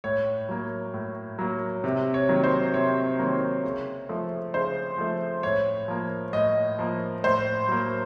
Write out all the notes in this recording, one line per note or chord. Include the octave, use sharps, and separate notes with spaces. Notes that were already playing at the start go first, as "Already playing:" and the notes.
A2 C#5
F#3 A#3
A2
F#3 A#3
C3
C#5
D#3 F#3 A#3
C5
C3 C#5
D#3 F#3 A#3
C#3
F3 A3
C#3 C5
F3 A3
A2 C#5
F3 A#3
A2 D#5
F3 A#3
A2 C5
F#3 A#3